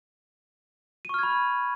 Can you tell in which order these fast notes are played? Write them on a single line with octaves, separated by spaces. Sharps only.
D#7 C#6 F6 G#6 B5